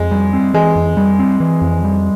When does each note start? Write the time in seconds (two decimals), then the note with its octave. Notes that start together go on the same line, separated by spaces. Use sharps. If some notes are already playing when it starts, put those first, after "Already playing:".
Already playing: F2 G#3
0.11 G3
0.33 C4
0.54 E3 G#3
0.76 F2
0.97 G3
1.19 C4
1.40 E3
1.61 F2
1.84 G3